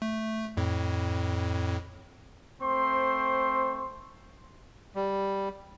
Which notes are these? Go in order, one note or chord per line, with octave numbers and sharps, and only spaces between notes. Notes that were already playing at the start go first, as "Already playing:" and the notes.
A3
F2 A2
A3 C4 C5 C6 C#6
G3